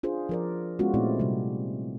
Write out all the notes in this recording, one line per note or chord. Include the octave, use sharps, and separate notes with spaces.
D4 F4 G#4 C5
F3 A#4 D5
G#3 B3 C#4 F4 F#4
A#2 A3 C4 E4 D5
C3 G3